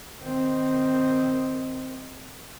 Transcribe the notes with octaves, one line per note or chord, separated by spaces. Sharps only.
D#3 C4